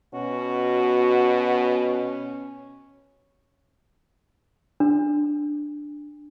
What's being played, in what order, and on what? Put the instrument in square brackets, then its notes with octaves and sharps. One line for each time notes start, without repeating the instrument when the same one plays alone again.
[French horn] B2 [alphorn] C#4 [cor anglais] F#4
[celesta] D4